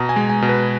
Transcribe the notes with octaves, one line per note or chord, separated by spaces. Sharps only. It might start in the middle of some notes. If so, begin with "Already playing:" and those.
Already playing: B2 A#5
G#5
G#3
G#5
B2
B4